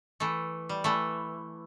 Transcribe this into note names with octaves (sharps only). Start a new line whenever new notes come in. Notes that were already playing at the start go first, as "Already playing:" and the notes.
E3 A3
G3
E3 A3